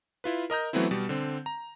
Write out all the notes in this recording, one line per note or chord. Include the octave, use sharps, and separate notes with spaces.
E4 F4 B4
A#4 D#5 A#5 G6
E3 F#3 A3 B3 C4 E4
B2 G3
D3 C4
A#5